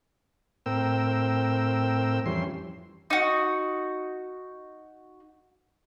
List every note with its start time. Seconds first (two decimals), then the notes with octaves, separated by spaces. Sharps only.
0.66 A2 C4 A#4 G5 E6
2.26 F2 E3 G3 C#4 C6
3.10 D#4 F#4